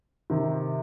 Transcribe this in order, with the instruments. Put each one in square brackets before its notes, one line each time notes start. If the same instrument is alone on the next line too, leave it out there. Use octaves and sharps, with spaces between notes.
[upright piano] C3 D#3